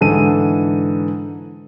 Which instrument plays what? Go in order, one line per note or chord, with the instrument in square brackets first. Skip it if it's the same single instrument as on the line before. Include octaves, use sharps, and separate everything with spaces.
[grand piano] G#2 D3 E3 A4 D#7